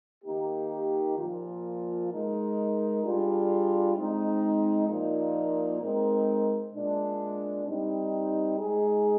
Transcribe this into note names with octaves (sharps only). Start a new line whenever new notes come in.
D#3 A#3 D#4 G4
A#2 F3 A#3 F4
G#3 D#4 A#4
G3 D4 F4 G#4
G#3 C4 D#4
A#2 F3 A#3 D#4
G#3 C4 D#4 A#4
A#2 G#3 D4
G3 C4 D#4
G#3 D#4 G#4